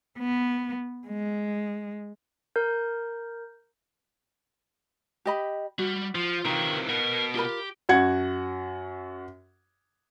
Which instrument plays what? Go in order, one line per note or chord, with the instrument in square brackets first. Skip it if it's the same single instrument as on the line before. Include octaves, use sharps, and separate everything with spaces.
[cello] B3
G#3
[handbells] A#4 G6
[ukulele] G4 D#5 B5
[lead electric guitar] G3 [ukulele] F#4
[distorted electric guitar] F3 [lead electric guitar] F4
[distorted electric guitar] C3 E3 [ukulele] D#4 F4 [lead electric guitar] A#4 G5
[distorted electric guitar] B2 [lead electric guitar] A#4
[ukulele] F4 A#4 B5 [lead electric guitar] G4
[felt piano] F#2 F#4 F#5 G#6 C#7